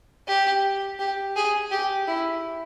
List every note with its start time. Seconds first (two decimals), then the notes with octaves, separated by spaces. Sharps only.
0.27 G4
0.99 G4
1.36 G#4
1.71 G4
2.07 E4